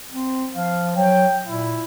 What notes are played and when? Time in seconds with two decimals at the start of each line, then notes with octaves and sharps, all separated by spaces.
0.11 C4
0.55 F3 F5
0.96 F#3 G5
1.46 A#2 E4